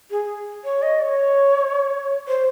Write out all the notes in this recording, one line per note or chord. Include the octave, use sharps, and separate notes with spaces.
G#4
C#5
D#5
C#5
C5